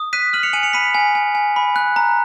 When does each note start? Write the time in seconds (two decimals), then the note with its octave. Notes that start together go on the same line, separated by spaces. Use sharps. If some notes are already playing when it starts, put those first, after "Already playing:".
Already playing: D#6
0.13 F#6 B6 D#7
0.33 F6 D#7 F#7
0.43 C#7 F7
0.53 G#5 D#7 F#7
0.63 C#7 F7
0.73 B5 B6 D#7
0.95 G#5
1.15 G#5
1.35 G#5
1.56 B5
1.76 F#6
1.96 A#5